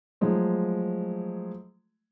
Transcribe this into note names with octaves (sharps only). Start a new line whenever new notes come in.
F3 F#3 G#3 A3